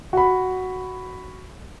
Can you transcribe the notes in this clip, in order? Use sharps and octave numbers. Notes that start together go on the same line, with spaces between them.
F#4 B5